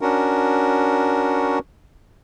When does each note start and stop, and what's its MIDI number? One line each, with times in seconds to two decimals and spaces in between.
0.01 1.59 61
0.01 1.59 62
0.01 1.59 66
0.01 1.59 70